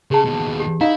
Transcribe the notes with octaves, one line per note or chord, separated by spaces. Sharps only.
C#3 G4 G#4 A5
D#2 B2
G4
D#4 E4 F5